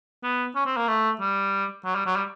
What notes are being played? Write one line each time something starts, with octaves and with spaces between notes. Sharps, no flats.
B3
C#4
C4
A#3
A3
G3
F#3
G3
F#3
G3